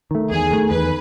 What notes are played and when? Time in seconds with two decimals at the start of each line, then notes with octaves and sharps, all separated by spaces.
0.11 D#3 A3
0.30 E2 G#4
0.51 D#3 A3
0.70 E2 B4